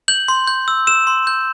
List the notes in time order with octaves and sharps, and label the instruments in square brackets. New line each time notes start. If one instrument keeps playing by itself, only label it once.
[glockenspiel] G6 F#7
C6
G6
E6
E6 E7
C6
G6